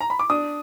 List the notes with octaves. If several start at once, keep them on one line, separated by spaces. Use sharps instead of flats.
A#5
B5
D6
D4 D#6